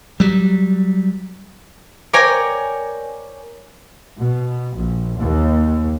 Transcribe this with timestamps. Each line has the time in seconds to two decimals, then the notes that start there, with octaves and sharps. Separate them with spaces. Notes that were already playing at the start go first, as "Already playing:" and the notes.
0.20 F#3 G3
2.13 A#4 C#5 D5 G5 G#5 A#5
4.17 B2
4.75 A#1
5.18 D#2